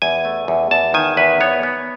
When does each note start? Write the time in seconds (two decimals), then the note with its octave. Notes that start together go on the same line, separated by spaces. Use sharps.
0.02 E2 G#5
0.25 A3
0.48 E2
0.71 E2 A5
0.94 D#3 G#5
1.17 E2 B4
1.40 B3 C#5
1.63 B3